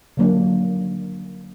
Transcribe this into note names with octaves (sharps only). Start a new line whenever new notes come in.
D3 F#3 A#3 D4